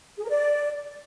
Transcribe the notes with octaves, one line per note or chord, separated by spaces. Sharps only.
G#4
A#4
D5